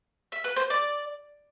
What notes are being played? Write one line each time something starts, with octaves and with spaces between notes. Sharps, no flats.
E5
B4
C5
D5